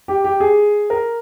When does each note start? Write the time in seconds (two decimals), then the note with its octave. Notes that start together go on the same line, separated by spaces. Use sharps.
0.08 G4
0.24 G4
0.40 G#4
0.90 A#4